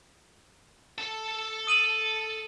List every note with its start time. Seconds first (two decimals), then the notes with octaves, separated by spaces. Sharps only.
0.98 A4 A5
1.67 D#6 D#7 F#7